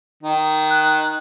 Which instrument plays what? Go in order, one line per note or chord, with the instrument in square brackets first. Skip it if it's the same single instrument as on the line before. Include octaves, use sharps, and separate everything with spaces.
[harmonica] D#3
[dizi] F#6